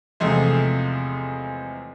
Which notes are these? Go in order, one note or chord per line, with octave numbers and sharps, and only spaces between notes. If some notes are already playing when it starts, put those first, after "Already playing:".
E2 C3 F3 G#3 A3